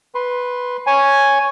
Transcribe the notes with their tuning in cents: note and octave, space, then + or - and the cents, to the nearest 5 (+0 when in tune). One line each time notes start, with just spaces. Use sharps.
B4 +0 C6 +15
C#5 +0 G#5 +0